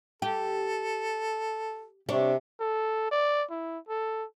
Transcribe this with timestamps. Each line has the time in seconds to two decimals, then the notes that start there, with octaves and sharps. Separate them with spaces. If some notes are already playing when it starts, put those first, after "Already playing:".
0.22 G4 A4
2.09 C3 D4 C#5
2.60 A4
3.11 D5
3.51 E4
3.89 A4